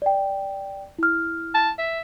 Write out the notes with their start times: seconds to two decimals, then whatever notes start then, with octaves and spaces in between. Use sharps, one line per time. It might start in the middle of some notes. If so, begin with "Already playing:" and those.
0.02 D5 G5
0.99 E4 F6
1.54 A5
1.78 E5